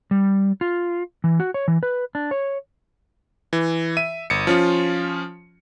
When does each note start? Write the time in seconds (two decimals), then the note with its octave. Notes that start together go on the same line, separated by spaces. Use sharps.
0.11 G3
0.61 F4
1.24 E3
1.40 F#4
1.54 C#5
1.68 E3
1.83 B4
2.15 D4
2.31 C#5
3.53 E3
3.97 E5 D#7
4.30 G1 C#7
4.47 F3 C#4 F4